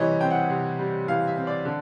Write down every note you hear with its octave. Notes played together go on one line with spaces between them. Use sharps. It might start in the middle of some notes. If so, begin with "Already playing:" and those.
Already playing: C3 E3 G3 C#5 D#5
C4 G5
F#5
C3
G3
E3 F5
E5
C4
D5
D3